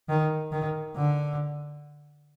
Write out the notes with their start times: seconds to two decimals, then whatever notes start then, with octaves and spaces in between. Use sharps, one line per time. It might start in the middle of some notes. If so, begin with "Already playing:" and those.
0.09 D#3
0.52 D#3
0.96 D3